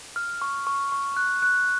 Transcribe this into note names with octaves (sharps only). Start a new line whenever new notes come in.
F6
C#6
C#6
C#6
F#6
F#6